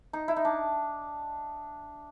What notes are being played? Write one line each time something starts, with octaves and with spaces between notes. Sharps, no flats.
D#4
E4
D#4
D4